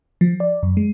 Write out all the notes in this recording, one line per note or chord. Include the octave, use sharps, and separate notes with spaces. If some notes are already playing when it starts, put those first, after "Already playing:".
F3
D5
F#2
G#3